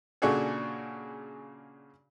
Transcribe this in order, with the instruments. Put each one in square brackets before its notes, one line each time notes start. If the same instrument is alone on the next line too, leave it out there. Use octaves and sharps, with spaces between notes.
[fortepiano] A#2 C#3 D4 F#4 G#4 A4